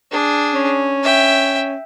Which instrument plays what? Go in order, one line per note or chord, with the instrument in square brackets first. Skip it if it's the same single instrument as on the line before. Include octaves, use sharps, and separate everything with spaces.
[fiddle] D4 G#4
[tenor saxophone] C#4
[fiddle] E5 G5